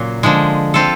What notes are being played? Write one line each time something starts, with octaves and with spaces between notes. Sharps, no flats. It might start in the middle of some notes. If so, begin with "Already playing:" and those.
Already playing: A#2 C#3 F#3 A#3
D3 F3 G#3
C4 F4 A4